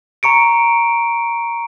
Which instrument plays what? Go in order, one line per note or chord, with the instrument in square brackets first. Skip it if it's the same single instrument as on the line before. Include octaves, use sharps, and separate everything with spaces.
[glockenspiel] A#5 C#6 C#7 D7